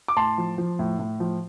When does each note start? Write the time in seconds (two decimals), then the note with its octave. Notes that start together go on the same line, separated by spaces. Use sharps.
0.08 D6
0.16 A2 A5 C6
0.38 F3
0.58 F3
0.79 A2
0.99 A2
1.20 F3